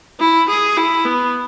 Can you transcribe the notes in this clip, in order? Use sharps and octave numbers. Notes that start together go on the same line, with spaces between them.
E4
G#4
E4
B3